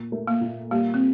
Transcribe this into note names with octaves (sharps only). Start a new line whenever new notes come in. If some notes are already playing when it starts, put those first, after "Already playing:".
Already playing: A#2
A3
A#3
A#2
G3 A#3
C4